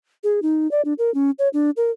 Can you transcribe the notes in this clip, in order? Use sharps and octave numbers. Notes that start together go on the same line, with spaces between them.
G#4
D#4
D5
D4
A#4
C#4
C#5
D4
A#4